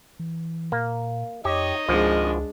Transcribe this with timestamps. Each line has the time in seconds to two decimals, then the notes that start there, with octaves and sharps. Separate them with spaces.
0.19 E3
0.72 A#2 A#3
1.45 F2 D#4 G4 C#5 D#5
1.88 G#1 C#2 F3 G#3 D4